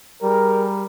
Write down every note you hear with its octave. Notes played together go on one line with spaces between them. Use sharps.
G3 G#4 A#4